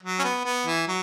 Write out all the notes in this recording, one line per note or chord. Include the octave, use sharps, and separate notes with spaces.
F#3
C#4
B3
B3
E3
F#3